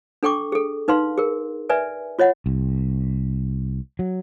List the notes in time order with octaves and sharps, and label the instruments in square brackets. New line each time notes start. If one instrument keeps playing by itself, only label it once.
[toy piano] D4 A4 G5 C#6 D6
G#4 A4
D#4 B4 F5 C6
G#4 A#4
B4 D5 E5 G#5
F4 C#5 D#5 F#5
[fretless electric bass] C2
F#3